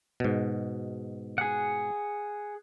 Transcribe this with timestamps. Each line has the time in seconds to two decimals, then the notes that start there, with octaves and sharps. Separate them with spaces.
0.20 G#2 B2
1.38 G#4 F#5